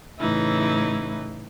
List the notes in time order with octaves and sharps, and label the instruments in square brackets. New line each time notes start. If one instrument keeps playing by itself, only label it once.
[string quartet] A2 C#3 E3 D#4 E4